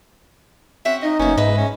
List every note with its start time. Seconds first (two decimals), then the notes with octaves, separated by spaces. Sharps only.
0.85 C4 C#4 F#4 E5
1.02 D#4 D#5
1.19 F#1 A#3 B3 C#4
1.37 G#2 B4 D#5 E5
1.57 C#4